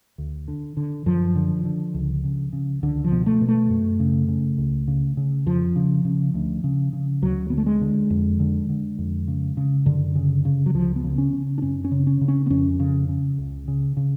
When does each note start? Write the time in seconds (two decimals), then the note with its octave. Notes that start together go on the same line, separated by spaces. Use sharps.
0.18 D2
0.48 D3
0.77 D3
1.06 F#2 F3
1.36 D3
1.65 D3
1.94 C#2
2.24 C#3
2.53 C#3
2.83 C#2 D3
3.04 F3
3.12 B2
3.26 A3
3.41 B2
3.48 A3
3.70 F#2
4.00 C#3
4.28 C#3
4.58 C#2
4.88 C#3
5.17 C#3
5.46 F2 F3
5.76 C#3
6.05 C#3
6.34 D2
6.64 C#3
6.93 C#3
7.22 D2 F#3
7.50 D3 B3
7.58 A3
7.66 G#3
7.81 D3
8.10 F2
8.40 D3
8.69 D3
8.98 F2
9.28 C#3
9.57 C#3
9.86 F#2 D3
10.15 C#3
10.45 C#3
10.66 F#3
10.74 C#2 F3
10.96 B3
11.04 C#3
11.18 C#4
11.33 C#3
11.58 D4
11.62 F#2 C#4
11.84 C#4
11.92 C#3
12.07 C#4
12.21 C#3
12.28 C#4
12.46 B3
12.50 F2 C#4
12.80 C#3
13.09 C#3
13.38 C#2
13.68 C#3
13.97 C#3